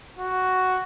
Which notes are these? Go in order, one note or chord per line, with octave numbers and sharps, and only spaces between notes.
F#4